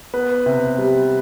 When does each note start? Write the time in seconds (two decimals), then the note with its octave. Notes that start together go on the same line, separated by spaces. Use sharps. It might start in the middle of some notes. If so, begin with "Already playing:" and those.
0.14 B3 B4
0.46 C3
0.78 G3